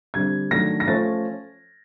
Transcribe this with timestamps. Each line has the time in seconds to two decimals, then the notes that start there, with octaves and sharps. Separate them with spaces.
0.14 D3 G3 C4 G#6
0.51 D#3 F#3 A3 D4 A#6
0.80 A#6
0.87 F3 A3 C#4 A6